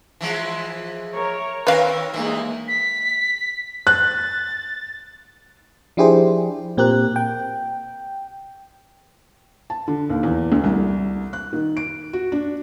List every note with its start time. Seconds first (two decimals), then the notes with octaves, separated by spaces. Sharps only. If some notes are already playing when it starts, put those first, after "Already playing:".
0.21 E3 F3 G#3
1.12 A#4 C#5 A#5
1.67 D#3 C4 A#4 B4 C#5 F5
2.14 G2 E3 G#3 A#3 D#4
2.68 B6
3.87 F#6 A6
5.97 F3 D4 E4 G4 G#4 C5
6.77 A#2 C4 G4 A#4 F#6
7.16 G5
9.70 A5
9.88 D3
10.10 D#2
10.23 E2
10.52 D2
10.64 C2
11.33 F#6
11.53 D#3
11.77 D7
12.13 F#4
12.32 D4